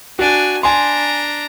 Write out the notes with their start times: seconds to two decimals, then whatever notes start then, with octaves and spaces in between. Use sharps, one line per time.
0.19 D4 F#4 G#5
0.63 D4 G#5 A#5 C6